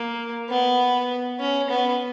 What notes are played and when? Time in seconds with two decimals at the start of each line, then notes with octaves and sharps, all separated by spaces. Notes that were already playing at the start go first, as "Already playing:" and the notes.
Already playing: A#3
0.50 B3
1.40 C#4
1.70 B3